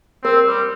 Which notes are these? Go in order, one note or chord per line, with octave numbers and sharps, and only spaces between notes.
C4 A#4
G3